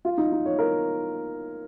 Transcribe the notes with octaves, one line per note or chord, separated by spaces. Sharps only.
F4
D#4
D#4
C#5
A#4